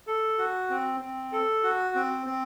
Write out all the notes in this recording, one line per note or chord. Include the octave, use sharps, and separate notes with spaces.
A4
F#4
C4
C4
A4
F#4
C4
C4